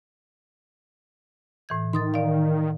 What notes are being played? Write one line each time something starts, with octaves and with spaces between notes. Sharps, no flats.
A2 E3 G#6
D#3 C6 D#6 A6
D5 F5